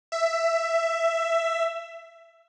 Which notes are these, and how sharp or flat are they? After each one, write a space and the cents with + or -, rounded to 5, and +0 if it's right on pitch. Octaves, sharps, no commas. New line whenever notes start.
E5 +15